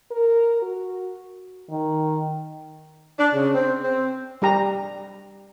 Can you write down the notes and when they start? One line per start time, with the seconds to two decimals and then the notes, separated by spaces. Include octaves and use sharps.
0.11 A#4
0.62 F#4
1.70 D#3
3.18 D4
3.33 C#3
3.53 C4
3.83 C4
4.42 G3 G4 A#5